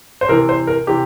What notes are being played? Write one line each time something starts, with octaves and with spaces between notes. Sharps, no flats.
C5
C3 E3 A#4
C5
A#4
C3 E3 G4